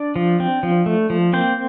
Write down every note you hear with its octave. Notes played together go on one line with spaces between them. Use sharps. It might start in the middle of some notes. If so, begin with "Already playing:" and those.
Already playing: D4 D5
F3
C4
F3
A3
F3
A#3 C4 C5